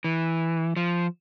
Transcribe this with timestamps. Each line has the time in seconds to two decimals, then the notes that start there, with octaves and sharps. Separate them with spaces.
0.04 E3
0.76 F3